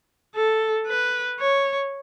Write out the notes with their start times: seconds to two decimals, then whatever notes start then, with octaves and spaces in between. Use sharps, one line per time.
0.36 A4
0.87 B4
1.39 C#5